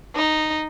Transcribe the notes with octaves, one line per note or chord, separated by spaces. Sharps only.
D#4